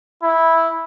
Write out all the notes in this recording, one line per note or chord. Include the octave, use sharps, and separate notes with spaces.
E4